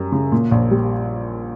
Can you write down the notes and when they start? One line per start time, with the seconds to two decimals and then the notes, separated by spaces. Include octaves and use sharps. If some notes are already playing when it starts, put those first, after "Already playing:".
Already playing: F#2 G3
0.12 C#3
0.32 A#2
0.51 A#1
0.71 G3